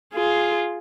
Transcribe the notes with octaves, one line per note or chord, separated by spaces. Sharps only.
F4 G#4